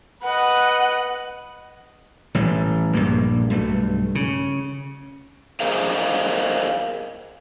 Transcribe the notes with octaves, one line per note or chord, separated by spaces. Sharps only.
B4 D#5 F#5
A1 A2 G3
A#1 G2 A#3
B1 G2 A3
C#3
G#4 A#4 C5 D#5 F5